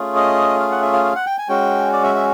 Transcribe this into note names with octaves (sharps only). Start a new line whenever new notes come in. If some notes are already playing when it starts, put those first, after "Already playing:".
Already playing: A3 C#4 F4 G#4
D#5
F5
F#5
E5
F5
F5
F#5
G5
G#5
G#3 C#4 F#4 G5
D5
E5
E5